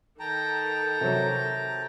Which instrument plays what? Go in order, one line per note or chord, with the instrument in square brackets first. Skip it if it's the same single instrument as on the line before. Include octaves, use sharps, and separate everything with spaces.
[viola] D#3 A4 [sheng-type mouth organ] G5 A5 A#5
[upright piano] C3 F#3